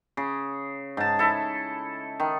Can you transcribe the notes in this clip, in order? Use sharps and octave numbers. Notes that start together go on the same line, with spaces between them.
C#3
G#2 A5
E4 A4
D#3